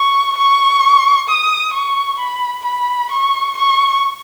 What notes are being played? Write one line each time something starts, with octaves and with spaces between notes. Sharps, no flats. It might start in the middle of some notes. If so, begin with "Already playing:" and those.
Already playing: C#6
C#6
D#6
C#6
B5
B5
C#6
C#6